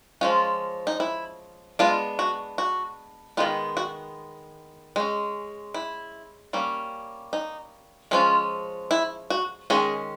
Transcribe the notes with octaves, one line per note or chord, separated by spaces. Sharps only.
F3 G#3 C#4 F4
D#4
E4
G#3 B3 D4 F4
F#4
F#4
D#3 G#3 B3 F4
F#4
G#3 C#4
E4
G3 A#3 C#4
D#4
F3 G#3 C#4 F4
E4
F#4
D#3 G#3 C#4 G#4